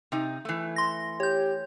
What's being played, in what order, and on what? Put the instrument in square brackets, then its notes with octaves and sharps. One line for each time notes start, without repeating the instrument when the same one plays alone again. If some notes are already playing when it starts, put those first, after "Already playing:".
[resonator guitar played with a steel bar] C3 D#4
E3 A3
[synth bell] C6 A#6
[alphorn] G4 [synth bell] C#5 G6